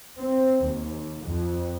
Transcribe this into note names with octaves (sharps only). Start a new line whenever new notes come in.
C4
D#2
F2